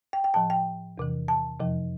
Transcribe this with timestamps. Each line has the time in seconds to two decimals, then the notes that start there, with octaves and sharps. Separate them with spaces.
0.13 G5
0.24 G5
0.34 A2 F3 A5
0.50 G5
0.98 E2 C3 E3
1.28 A5
1.60 F2 C3 F3